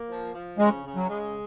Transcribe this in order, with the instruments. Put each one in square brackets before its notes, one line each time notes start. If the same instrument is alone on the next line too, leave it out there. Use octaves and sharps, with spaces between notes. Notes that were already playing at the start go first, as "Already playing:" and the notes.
Already playing: [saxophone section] A#3
F3
F3
[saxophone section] C#3 [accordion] G#3
[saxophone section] C#3
[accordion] F#3
[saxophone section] G#3